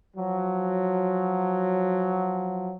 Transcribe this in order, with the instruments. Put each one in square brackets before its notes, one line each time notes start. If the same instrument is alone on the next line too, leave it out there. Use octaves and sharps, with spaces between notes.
[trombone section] F3 F#3